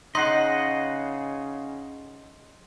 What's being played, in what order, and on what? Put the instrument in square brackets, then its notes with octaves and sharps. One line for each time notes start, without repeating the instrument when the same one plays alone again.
[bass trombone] C#3 [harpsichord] D#4 [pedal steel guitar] D#5 F#5 [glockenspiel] C6 C7